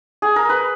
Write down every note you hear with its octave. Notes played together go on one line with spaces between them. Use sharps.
G#4
A#4
B4